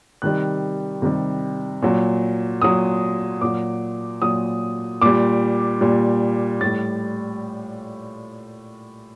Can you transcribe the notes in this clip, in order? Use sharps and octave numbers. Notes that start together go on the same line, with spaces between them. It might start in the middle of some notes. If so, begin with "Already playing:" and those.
C3 D#3 G3 F#6
C3 D#3 G3
A#2 F#3
A#2 F#3 D#6
A#2 F#3 D6
A#2 F#3 D#6
A#2 G3 D6
A#2 G3
A2 G3 A6